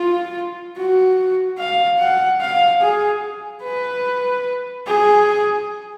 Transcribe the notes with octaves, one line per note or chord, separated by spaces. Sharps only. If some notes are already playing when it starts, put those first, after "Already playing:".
Already playing: F4
F#4
F5
F#5
F5
G#4
B4
G#4